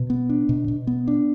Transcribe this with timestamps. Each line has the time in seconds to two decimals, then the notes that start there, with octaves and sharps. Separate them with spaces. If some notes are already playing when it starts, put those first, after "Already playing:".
Already playing: B2
0.10 B3
0.29 D4
0.49 B2
0.68 B2
0.87 B3
1.08 D4